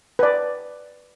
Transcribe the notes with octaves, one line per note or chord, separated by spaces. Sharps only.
B4 D5